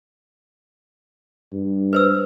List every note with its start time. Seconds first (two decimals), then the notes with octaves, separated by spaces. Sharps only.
1.52 G2
1.93 B4 C5 E6